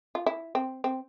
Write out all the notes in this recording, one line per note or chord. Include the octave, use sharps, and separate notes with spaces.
F4
E4
C4
C4